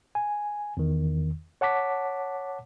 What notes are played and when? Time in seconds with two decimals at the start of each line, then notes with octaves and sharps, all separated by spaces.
0.15 G#5
0.77 E2 D#3
1.61 C#5 F#5 A5 D6 B6